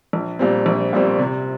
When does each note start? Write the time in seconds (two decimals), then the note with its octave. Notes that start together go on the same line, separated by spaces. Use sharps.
0.13 A#1
0.39 A#2 G3 C4
0.66 A#1
0.93 A#2 G3 C4
1.19 C3